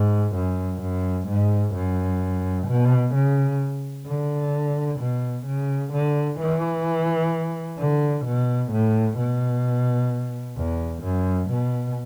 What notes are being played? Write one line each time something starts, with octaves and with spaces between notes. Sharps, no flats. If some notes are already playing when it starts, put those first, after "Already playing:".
Already playing: G#2
F#2
F#2
G#2
F#2
B2
C#3
D3
B2
C#3
D3
E3
D3
B2
A2
B2
E2
F#2
B2